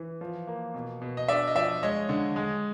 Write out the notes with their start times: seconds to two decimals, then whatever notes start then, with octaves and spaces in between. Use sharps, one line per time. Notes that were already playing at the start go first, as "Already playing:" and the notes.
Already playing: E3
0.21 F3
0.47 A#3
0.74 B2
1.02 B2
1.17 D#5
1.28 D4 D5 E5
1.48 D#5
1.55 F3 D5 E5
1.83 G#3 C#5 D#5
2.09 D3
2.36 G#3